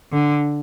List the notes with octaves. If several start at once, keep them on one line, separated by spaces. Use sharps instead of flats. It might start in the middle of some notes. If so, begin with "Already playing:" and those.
D3